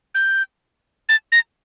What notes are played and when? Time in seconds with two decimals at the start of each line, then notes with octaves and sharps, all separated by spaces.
0.15 G6
1.09 A6
1.32 A#6